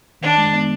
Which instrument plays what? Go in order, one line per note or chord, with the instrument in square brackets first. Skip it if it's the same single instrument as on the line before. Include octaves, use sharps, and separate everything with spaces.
[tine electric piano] D#3 [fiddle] D4
[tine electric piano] G#3
B3